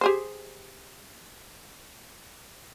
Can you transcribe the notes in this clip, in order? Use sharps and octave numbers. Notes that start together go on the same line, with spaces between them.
G4 G#4 C5